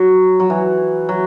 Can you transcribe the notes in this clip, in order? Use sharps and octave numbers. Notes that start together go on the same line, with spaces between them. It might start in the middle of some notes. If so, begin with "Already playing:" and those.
Already playing: F#3
F#3
E3
F#3